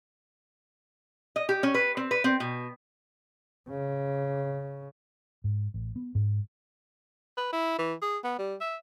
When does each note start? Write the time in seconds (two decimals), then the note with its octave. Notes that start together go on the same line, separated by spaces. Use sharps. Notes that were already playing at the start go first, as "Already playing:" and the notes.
1.36 D#5
1.49 G4
1.63 C#4
1.74 B4
1.97 C4
2.11 B4
2.24 C4
2.40 B2
3.70 C#3
5.44 G#2
5.74 A1
5.96 B3
6.15 G#2
7.37 B4
7.53 E4
7.79 E3
8.02 G#4
8.24 B3
8.39 G3
8.61 E5